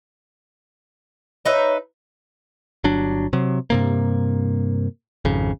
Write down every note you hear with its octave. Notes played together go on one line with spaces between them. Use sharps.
D#4 B4 C#5 E5
G1 F#3 D4
C3 F#3
G2 C3 A#3
G#1 F2 C#3